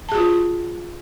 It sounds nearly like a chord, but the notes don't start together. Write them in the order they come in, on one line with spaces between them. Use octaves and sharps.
A5 G#4 F#4 F4